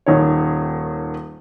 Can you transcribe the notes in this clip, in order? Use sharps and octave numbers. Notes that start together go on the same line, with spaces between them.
D#1 D#3 C#5